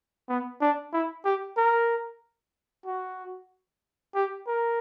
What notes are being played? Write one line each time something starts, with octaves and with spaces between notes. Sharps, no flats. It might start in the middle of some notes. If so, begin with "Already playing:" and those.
B3
D4
E4
G4
A#4
F#4
G4
A#4